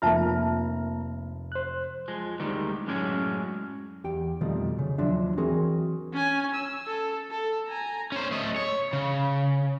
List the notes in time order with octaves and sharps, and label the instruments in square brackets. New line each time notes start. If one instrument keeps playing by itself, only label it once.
[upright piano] F1 F6 [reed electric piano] A#3 A#5 [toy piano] F4 E5 A5
[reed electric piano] C5 F#6
[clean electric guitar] F3 G#3
D2 D#3 G3 G#3
F#2 A2 G#3 C#4 D4
[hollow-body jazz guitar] E2 G4 G5
F2 B2 D#3 F3 G3 A3
C#3
D#2 F3 F#3 D4 E5
E3 C4 F#4 G#4 A#4
[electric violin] C#4 G#5
E6
A4
A4
G#5 A#5
[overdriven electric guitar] C#4 C5
A3 D#5
C#5
C#3